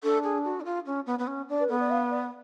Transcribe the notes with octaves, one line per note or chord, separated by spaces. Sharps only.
D4 A4
G#4
F#4
D4
F4
C#4
B3
B3
C#4
D4
B4
B3 A4
D5
F5
D5